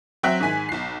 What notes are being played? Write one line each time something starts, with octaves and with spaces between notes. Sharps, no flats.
F#3 C4 E5 G5 F#6 B6
G#2 D#3 G#5 B6
B1 C7